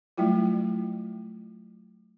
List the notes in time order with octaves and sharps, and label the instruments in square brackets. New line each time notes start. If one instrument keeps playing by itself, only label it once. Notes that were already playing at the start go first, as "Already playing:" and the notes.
[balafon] F#3 G3 A3 E4 F4